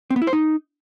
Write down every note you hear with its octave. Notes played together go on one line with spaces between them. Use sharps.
C4
B3
E4
C5
D#4